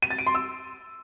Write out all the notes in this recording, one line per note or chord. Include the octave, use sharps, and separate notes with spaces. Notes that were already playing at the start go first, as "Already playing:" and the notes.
D#7
A6
D7
C6
E6